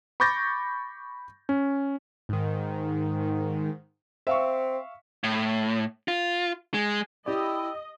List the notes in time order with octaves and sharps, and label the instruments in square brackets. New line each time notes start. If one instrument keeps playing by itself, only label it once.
[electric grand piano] B5 C#6 D6 G6 A6 A#6
C#4
[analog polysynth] G#2 D#3
[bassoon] C4 [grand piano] E5 F5 C#6
[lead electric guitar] A2
F4
G#3
[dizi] E4 [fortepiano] G4 D5 [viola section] D#5 [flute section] G5 B5 E6